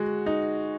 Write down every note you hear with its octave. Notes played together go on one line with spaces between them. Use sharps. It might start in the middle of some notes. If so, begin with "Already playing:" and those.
Already playing: G#3 F#4
D#4